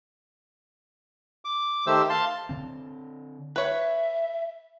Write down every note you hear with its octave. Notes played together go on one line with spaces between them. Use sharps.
D6
D#3 A3 G4 C5 E6
F5 A5 C6
D3 C4
B4 C#5 E5